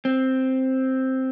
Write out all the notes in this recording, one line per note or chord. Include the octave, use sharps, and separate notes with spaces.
C4